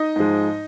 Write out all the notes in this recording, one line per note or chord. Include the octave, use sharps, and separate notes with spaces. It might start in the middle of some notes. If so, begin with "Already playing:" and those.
Already playing: D#4 D#5
G#2 F3 G#3